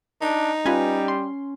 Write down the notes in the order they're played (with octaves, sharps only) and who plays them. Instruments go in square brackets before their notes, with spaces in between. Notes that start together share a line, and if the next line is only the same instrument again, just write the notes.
[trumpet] D4 [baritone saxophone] D#4
[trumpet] G3 [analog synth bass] C#4 [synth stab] F4 B4 G#5
[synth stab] C6